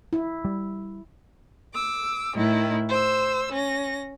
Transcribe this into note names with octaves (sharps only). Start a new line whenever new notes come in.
E4
G3
D6 E6
A2 D#3 E4
C5 E6
C#4 A#6